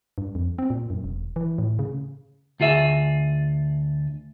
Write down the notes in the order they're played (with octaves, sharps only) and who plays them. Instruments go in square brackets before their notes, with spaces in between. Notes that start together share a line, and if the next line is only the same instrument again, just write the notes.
[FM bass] G2
F2
C4
A#2
F#2
E1
E3
A2
C#3
[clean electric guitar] D2 F4 G#4 E5